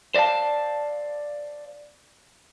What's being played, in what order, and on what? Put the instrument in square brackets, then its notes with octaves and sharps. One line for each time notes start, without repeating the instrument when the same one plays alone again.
[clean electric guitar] C5 D5 D#5 F5 A5